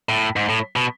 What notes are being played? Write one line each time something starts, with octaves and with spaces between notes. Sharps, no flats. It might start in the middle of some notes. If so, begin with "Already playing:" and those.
A2
G#2
A2
B2